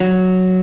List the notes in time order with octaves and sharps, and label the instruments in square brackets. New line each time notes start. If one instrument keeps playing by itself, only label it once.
[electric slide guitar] F#3